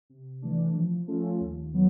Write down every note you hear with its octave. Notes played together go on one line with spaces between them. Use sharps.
C3
E3 A3 D4
F3
A3 C#4 F4 A4
D#2
F#3 B3